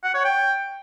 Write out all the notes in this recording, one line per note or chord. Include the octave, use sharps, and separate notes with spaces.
F#5
C#5
G5